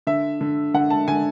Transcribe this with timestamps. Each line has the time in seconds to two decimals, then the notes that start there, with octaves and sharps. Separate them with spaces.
0.07 D3 E5
0.41 D3
0.74 D3 F#5
0.90 A5
1.08 D3 G#5